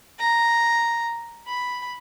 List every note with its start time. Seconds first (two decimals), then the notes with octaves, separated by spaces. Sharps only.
0.19 A#5
1.47 B5